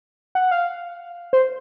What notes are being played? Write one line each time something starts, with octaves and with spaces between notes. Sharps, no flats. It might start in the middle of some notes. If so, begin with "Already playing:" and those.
F#5
F5
C5